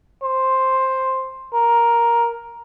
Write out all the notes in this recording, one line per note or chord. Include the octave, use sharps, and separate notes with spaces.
C5
A#4